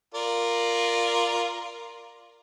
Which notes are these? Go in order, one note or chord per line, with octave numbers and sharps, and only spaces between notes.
F4 A#4 D5